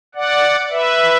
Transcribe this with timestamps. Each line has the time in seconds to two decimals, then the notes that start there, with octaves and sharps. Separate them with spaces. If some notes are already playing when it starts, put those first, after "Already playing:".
0.15 D5 F#5
0.71 B4 E5